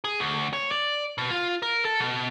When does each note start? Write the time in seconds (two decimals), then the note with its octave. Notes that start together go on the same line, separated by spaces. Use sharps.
0.04 G#4
0.20 D2
0.53 C#5
0.71 D5
1.18 B2
1.31 F4
1.62 A#4
1.85 A4
2.00 B2